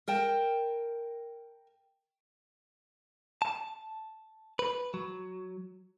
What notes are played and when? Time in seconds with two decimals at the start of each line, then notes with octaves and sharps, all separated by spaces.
0.08 A#4 G5 A5
3.42 A5
4.59 B4
4.94 F#3